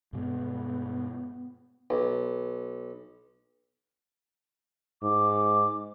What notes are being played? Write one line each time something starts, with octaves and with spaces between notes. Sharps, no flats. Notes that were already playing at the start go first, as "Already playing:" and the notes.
G2 B2 G#3 B3
B1
G#2 D6